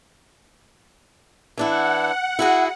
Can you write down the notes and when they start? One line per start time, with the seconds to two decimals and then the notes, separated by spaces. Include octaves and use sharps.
1.58 E3 D4 E4 F#5
2.39 E4 F#4 G#4